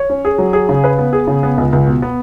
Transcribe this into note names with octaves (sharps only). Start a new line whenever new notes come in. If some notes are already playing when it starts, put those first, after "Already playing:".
Already playing: C#5
C#4
G#4
F#3
G#4
C#3
B4
B3
G#4
C#3
B3
C#2
C#2
B2
B3